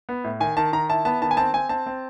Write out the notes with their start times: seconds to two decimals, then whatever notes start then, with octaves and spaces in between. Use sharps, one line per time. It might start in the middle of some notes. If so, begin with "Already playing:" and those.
0.09 B3
0.24 A2
0.40 D#3 G#5
0.57 D#3 A5
0.73 D#3 A#5
0.90 E4 A5
1.05 B3 A5
1.21 D#3 A5
1.31 G#5
1.37 C4 A5
1.54 C4 G#5
1.69 C4 A5
1.86 C4